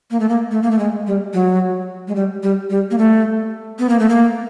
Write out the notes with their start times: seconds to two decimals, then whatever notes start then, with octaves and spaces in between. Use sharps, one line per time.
0.11 A#3
0.20 A3
0.29 A#3
0.52 A3
0.62 A#3
0.71 A3
0.79 G#3
1.07 G3
1.34 F#3
2.08 G#3
2.16 G3
2.43 G3
2.70 G3
2.91 A#3
2.98 A3
3.79 B3
3.89 A#3
3.99 A3
4.09 A#3